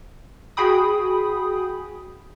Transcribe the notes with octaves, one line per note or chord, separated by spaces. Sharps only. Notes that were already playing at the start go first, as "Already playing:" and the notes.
F#4 G#4 G5 B5 D#6